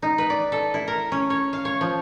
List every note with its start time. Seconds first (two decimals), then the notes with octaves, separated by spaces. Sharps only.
0.02 D#4
0.18 B4
0.30 D5
0.52 A4
0.74 E4
0.88 A#4
1.12 C#4
1.30 C#5
1.53 F5
1.65 C#5
1.81 F3